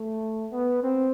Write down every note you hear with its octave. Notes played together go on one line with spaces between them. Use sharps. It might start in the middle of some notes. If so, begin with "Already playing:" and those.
Already playing: A3
B3
C4